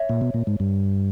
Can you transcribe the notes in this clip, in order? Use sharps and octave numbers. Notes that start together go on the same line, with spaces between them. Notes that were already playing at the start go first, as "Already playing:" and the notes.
Already playing: C#5 E5
A#2
B2
A#2
G#2
G2